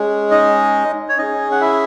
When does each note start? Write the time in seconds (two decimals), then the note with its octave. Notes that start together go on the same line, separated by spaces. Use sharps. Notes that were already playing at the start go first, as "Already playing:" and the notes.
Already playing: G#3 C#4 G#4
0.31 D#4 D#5
1.09 C#5
1.18 C#4 D#4 G#4 D#5
1.51 F#5
1.61 E4 E5